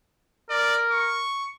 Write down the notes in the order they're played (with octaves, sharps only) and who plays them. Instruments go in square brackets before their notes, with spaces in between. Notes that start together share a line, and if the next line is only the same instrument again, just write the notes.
[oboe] A#4 [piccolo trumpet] D5
[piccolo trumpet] C#6